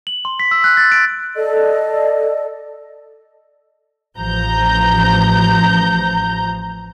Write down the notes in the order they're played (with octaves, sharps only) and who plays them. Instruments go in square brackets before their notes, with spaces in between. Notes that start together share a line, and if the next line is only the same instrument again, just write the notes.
[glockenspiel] F#7
C6
B6
E6
F#6
A6
D7
[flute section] A4 D5 D#5
[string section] A1 F3 A#5 G6